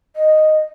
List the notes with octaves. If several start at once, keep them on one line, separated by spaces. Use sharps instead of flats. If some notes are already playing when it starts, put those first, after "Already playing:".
D#5